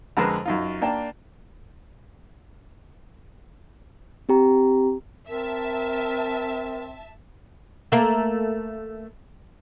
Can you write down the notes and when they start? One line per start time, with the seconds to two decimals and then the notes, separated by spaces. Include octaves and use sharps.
0.17 F2 D3 G#3 A#4 B4 A5
0.46 F#2 D#4 F4
0.82 A#3 D4 G5 A5
4.29 C4 G4 A#5
5.29 C4 A#4 E5 A5
7.92 A3 A#3